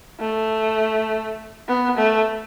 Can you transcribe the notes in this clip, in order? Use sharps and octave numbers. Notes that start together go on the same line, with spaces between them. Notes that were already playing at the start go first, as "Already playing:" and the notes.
A3
B3
A3